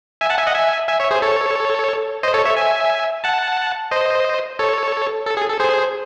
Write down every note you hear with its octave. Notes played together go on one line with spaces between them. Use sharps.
E5 G#5
F#5 A5
E5 G#5
D#5 F#5
E5 G#5
E5 G#5
C#5 E5
G#4 C5
A4 C#5
C5 D#5
A4 C#5
C#5 E5
E5 G#5
F#5 A5
C5 D#5
A4 C#5
A4
G#4
A4
G#4 C5